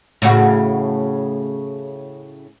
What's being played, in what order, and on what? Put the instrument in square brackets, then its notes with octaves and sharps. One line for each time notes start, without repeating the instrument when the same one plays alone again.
[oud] A2 C#3 F#4